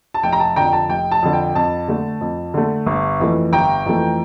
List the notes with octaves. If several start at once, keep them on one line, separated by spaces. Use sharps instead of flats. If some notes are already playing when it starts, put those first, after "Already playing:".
A5
F1 G5
A#5
A5
F2 D3 G5 A#5
A5
F1 G5
A5
F2 D3
G5
F2 A5
D3 A3
F2
D3 A3
G1
F2 E3 A3
G1 G5 A#5
F2 E3 A3